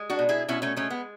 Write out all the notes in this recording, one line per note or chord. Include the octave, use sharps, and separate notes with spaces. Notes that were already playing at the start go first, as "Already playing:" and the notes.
Already playing: G#3
D4 F#4
B2
E4 G#4
B2 C#4 E4
A3 C#4
G#3 A3 C#4
B3